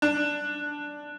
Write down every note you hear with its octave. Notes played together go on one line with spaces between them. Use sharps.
D4